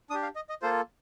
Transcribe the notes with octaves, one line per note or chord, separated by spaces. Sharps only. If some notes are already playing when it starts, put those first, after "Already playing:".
D4 G4 D#6
F5
D#5
D#5
A#3 F4 A4 C5